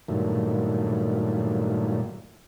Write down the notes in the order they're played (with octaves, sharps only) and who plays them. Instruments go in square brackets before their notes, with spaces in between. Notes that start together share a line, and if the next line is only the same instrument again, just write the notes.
[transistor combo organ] G2 A#2 D#3 F#3 A3